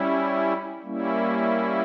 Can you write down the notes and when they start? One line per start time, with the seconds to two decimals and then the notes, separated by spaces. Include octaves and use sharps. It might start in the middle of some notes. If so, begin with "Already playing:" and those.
Already playing: G3 C#4 E4
0.82 G3 A#3 C#4 E4